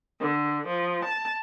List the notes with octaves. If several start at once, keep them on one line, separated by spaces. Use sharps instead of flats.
D3
F3
A5